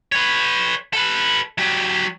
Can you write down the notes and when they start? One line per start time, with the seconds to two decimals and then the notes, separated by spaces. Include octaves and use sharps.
0.12 B4 C#5
0.93 A4 B4
1.58 F#3 G4